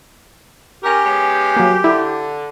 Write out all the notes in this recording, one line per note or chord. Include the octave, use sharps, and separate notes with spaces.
C#4 G4 A#4
G#3 B3 C#4
F#3 A#3
D3 E4